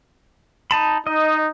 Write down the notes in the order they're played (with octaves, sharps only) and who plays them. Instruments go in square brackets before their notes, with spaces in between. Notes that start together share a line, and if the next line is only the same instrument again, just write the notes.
[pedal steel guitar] D#4 A5 B5
[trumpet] D#4 [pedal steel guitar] D#5